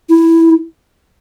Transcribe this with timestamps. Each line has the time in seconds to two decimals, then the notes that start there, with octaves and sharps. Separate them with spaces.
0.10 E4